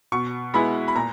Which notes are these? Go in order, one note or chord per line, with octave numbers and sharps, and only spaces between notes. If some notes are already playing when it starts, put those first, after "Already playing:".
B2 C#6
G#3 B3 E4 B5
B5
A#2 A#5